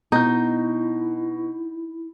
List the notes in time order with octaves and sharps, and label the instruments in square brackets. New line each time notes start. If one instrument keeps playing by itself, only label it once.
[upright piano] B2 G6 [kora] D#4 [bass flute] E4